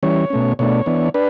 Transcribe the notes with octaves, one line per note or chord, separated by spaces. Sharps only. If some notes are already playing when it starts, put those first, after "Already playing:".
E3 G3 C#4 C#5
B2 A3 C#4
B2 A3 D4 C#5
E3 B3 D4
D4 B4